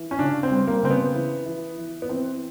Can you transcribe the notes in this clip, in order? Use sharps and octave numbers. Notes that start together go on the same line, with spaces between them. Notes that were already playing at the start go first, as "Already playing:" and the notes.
Already playing: E3
C#4
C#3 D4
C4
G3
A#3
C#3 C4
B3
E3
E3
E3
B3
E3 C4